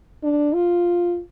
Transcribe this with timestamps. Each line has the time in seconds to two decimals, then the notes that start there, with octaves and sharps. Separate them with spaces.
0.23 D4
0.54 F4